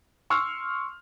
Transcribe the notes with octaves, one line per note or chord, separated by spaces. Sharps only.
C6 C#6 E6 F6